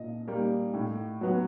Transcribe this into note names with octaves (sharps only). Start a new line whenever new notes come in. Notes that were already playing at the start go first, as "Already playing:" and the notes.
Already playing: A#2 D#5
G3 A#3
A2
F#3 B3